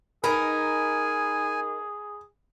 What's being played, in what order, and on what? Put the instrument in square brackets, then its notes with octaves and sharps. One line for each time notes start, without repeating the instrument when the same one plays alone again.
[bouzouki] D#4 A#4 [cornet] G#4 [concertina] G#5 [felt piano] B5